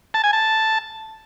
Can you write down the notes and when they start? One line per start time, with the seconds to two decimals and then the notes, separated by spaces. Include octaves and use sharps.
0.14 A5
0.24 G#5
0.33 A5